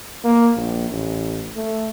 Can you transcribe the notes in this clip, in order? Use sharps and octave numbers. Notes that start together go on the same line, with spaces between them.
A#3
A#1
A1
A3